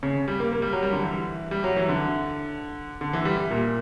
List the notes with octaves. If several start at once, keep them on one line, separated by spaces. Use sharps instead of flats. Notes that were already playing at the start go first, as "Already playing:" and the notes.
C#3
G3
A#3
A#3
G3
F#3
G3
D3
E3
G3
F#3
E3
D3
D3
E3
G3
A#2